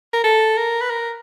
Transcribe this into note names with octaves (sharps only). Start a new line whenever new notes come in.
A#4
A4
A#4
B4
A#4